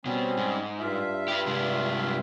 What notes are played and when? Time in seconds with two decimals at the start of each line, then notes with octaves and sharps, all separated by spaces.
0.05 B2 G3 C4 C#4
0.37 G#2
0.80 G2 F4 E5
1.28 G4 B4
1.46 C3 G#3